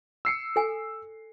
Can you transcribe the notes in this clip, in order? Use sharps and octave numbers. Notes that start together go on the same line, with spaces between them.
E6 C7 C#7
A4 G#5